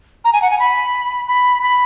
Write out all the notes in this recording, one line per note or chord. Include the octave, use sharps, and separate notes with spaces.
A#5
G#5
F#5
G#5
B5
B5
B5